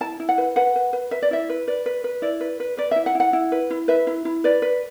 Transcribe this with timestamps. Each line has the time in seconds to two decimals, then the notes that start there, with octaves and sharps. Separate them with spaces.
0.01 E4 A5
0.20 E4
0.29 F#5
0.38 B4
0.56 B4 F#5
0.76 B4
0.93 B4
1.11 B4 E5
1.22 D5
1.31 E4 E5
1.49 B4
1.68 B4 D5
1.86 B4
2.04 B4
2.22 E4 D5
2.40 B4
2.60 B4
2.77 B4 D5
2.91 E4 E5
3.06 F#5
3.15 E4
3.20 F#5
3.33 E4
3.52 B4
3.70 E4
3.88 B4 E5
4.07 E4
4.25 E4
4.44 B4 D5
4.62 B4